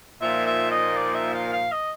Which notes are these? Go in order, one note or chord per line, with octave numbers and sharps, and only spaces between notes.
A#2 F3 A#3 D#4 E5
E5
D#5
D5
E5
F5
F5
D#5